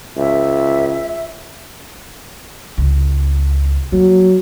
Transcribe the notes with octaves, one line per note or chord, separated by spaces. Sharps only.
C#2 E5
C#2
F#3 A#3